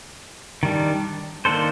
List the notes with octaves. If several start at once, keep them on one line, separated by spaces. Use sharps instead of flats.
D#3 G3 D4
D#3 A#3 D4 A4 C5